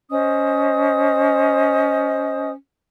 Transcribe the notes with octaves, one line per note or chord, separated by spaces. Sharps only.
C#4 C5 D#5 D#6